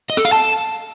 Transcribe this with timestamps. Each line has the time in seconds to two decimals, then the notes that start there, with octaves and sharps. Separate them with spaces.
0.10 D#5
0.17 A4
0.25 F5
0.33 A5